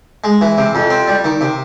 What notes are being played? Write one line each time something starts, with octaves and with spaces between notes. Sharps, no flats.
G#3
E3
C3
F2
C4
G3
D#3
C3